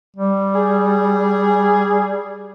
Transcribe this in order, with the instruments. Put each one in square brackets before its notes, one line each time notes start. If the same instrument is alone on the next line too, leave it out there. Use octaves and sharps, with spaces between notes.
[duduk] G3
[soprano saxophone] G#4